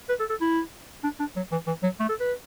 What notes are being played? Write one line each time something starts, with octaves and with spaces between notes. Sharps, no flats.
B4
A4
A4
E4
D4
D4
F#3
E3
E3
F#3
A3
A4
B4